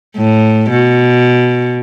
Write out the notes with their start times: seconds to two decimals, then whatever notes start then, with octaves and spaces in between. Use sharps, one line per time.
0.17 A2
0.70 B2